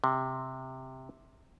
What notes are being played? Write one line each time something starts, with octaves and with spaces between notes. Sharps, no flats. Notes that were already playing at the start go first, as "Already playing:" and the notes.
C3